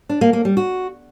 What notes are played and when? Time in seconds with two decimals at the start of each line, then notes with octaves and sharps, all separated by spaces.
0.09 D4
0.21 A#3
0.33 A#3
0.45 G3
0.57 F#4